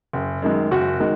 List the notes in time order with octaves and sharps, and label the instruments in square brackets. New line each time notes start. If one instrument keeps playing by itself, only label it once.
[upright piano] F#1
F#2 D#3 G#3
F#1 F#4
D#3 G#3